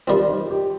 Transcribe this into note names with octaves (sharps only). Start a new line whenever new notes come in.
D#3 G3 C4 F4
D#4
G4